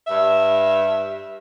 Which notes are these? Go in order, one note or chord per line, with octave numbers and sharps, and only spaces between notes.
G2 E5